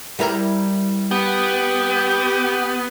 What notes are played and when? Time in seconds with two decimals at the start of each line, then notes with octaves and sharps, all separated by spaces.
0.19 G3 E4 A#4
1.11 B3 G4